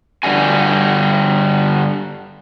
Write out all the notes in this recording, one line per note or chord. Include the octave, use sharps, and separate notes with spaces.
G2 D3 G3 F#4 G#5